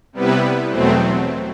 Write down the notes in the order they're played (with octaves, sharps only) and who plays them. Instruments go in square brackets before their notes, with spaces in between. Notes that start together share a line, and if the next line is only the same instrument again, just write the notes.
[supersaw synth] C3 G3 B3 E4 B4
E2 B2 F#3 A3 C4